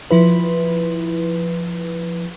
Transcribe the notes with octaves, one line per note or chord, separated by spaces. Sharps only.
F3 E4 B4